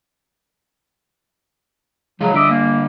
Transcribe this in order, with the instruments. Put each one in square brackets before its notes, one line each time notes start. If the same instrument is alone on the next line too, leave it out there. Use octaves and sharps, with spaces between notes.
[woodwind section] C#3 F#3 [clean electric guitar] F3 G#3 F4
[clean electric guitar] D3 G3 [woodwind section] D#5 E5 D6
[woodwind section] A#3